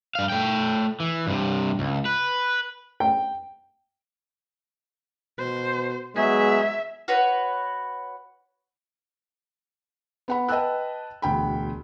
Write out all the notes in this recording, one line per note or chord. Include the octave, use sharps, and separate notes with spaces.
G2 F5
A3 G5
E3
G2 C3
C#2
B4
G5
B2 C5
F#3 G#3 B3 G#4 E5
F#4 B4 C#5
B3 F#5 B5
B4 D#5 G5 A5 E6 F#6
E1 D2 G5 B5